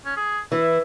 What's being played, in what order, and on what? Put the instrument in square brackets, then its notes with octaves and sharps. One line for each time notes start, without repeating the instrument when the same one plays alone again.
[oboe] C#4
G#4
[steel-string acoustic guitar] E3 [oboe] E4